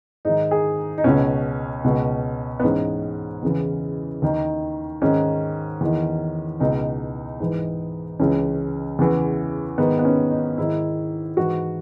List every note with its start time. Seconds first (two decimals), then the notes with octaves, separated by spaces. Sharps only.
0.25 G#2 D#3 D#4
0.51 G#4
0.98 D#4
1.04 C#2 B2 C#4
1.84 C#2 B2
2.60 B3
2.63 G#2 E3 C#4
3.43 E2 C#3 E3
4.22 D#2 D#3
5.02 G#2 D#3 C#4
5.81 E2 D#3
6.60 C#2 B2 D#4
7.40 G#2 E3
8.19 C#2 C#3 E3 C#4
8.99 E2 C#3 E3
9.78 G#2 D#3 B3
9.99 B3
10.05 C#4
10.31 D#4
10.58 G#2 D#3 E4
11.37 G#2 E3 F#4